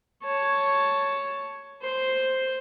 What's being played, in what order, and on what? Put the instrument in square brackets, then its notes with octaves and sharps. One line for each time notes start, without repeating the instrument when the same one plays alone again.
[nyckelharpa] C#5 A5
C5